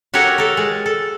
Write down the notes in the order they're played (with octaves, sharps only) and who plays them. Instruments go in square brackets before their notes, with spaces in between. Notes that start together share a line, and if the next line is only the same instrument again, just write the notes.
[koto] F#4 G4 A4 A#4 C#5 F#5
A4 A#4
G#3
A4